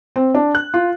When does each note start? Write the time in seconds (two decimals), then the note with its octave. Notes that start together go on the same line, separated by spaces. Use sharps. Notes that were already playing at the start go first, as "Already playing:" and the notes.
0.16 C4
0.34 D4
0.55 F#6
0.74 F4